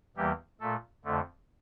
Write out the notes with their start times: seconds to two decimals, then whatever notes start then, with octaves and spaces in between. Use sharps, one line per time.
0.17 E2 E3 G3 A#3 G4
0.60 A#2 A3 A4
1.05 F2 D3 A3